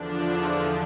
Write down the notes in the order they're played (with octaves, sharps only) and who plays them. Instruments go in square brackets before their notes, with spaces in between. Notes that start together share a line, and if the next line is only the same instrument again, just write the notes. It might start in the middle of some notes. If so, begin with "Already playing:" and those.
Already playing: [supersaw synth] E2 D3 F3 D4